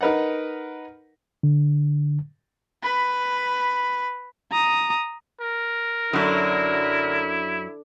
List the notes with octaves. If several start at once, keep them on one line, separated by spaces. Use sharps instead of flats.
D#4 A#4 B4 D#5 F#5
D3
B4 B5
A#5 D#6
A#4
F#2 D3 F#3 E4